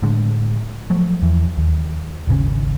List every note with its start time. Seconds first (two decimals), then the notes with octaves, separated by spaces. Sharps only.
0.02 A2 D3 G#3
0.90 F3 F#3 A3
1.22 E2 E3
1.57 D#2
2.27 D#1 G#1 C#3 C#4